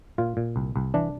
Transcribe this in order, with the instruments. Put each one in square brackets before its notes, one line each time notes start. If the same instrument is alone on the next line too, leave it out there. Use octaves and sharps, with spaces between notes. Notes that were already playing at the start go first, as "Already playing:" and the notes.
[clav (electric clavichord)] A#2 F4
A#2
C2
C2
E3 D4